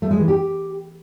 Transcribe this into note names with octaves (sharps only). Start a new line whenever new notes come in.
A3
G#3
E3
G4